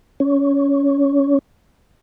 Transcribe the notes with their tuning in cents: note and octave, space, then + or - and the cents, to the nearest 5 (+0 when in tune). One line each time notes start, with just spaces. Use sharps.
C#4 +15